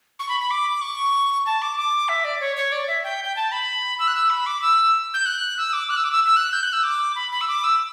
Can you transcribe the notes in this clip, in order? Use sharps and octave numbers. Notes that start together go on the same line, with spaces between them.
C#6
B5
B5
D6
C#6
A5
D6
D6
E5
D5
C#5
C#5
D5
E5
G5
G5
A5
B5
E6
F#6
E6
B5
D6
E6
G6
F#6
E6
D6
F#6
E6
D6
E6
E6
F#6
G6
F#6
E6
D6
B5
B5
E6
D6
E6